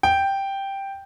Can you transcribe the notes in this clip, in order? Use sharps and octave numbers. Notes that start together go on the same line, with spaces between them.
G5